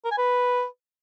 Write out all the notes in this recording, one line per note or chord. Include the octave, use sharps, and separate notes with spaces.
A#4
G#5
B4